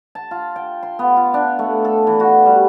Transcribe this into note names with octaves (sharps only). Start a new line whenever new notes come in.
A5
F4
G5
C6
B3
F4
D4
A3
A4
E3
F#4
G3